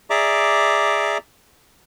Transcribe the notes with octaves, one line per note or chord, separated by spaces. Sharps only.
G#4 D5 E5 A#5 D6